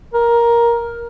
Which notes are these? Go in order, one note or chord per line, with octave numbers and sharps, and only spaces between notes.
A#4